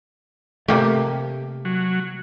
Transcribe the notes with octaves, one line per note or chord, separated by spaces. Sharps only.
C3 A3 A#3 G4
F#3